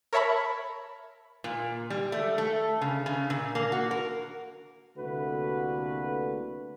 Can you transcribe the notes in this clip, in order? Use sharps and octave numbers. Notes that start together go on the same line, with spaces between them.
A#4 C#5 E5 A5 B5
A#2
G3
A3
A3
C#3
C#3
A#2
A#3
F#4
A#4
C2 D3 A3 A#3 F#4 B4